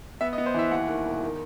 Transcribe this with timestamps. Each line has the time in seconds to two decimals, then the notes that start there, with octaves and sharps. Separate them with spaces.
0.21 B3 E5
0.33 D#5
0.38 B3
0.46 C5
0.54 E3 E5
0.71 D#2 F#5
0.88 D#3
1.05 E1
1.23 D#3